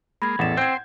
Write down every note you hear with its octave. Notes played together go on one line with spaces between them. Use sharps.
G#3 A#3 B5 G#6
A1 E2 A4 F#5 E7
C4 C5 G6 G#6